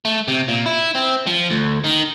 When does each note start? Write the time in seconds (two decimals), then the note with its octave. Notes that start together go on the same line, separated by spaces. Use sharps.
0.05 A3
0.28 C3
0.48 A#2
0.66 E4
0.95 C4
1.27 F3
1.50 D2
1.84 D#3